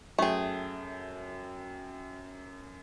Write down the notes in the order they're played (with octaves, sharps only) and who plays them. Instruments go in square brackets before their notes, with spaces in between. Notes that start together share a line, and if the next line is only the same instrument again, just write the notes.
[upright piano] F#2 G5 [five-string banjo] A3 G#4